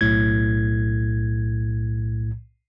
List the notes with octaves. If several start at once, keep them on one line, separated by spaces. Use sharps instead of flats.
B1 A2 G#6